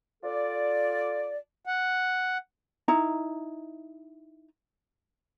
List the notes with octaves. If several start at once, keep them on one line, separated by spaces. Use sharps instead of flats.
F4 A4 D5
F#5
D#4 E4 A#5